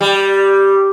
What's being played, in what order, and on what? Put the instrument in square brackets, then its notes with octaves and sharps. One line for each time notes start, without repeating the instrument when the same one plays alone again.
[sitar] G3